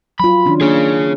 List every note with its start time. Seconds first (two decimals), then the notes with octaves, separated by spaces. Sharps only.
0.20 F#3 F4 B5
0.46 D#3 C#4 D4
0.61 A#3 D4 D#4 G#4 C#5